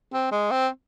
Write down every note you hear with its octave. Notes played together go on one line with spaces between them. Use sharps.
C4
G#3
C4